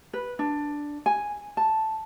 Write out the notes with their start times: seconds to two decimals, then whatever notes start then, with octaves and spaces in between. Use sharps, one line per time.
0.13 B4
0.39 D4
1.06 G#5
1.57 A5